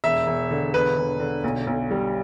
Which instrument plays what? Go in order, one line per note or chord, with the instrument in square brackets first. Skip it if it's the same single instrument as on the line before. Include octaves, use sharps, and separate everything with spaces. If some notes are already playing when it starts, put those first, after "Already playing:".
[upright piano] E1 E5
E1
D3
E1 B4
E1
D3
B1
B1
G3